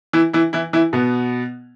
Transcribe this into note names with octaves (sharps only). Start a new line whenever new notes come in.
E3 E4
E3 E4
E3 E4
E3 E4
B2 B3